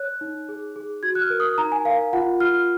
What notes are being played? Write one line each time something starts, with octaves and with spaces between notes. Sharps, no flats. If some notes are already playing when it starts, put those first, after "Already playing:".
Already playing: C#5 F#6
D#4
G#4
G#4
F#4 G#6
F#6
F6
A#4
D#6
D#4 A#5
G#5
A#4 F5
F4 F#5
F4 F6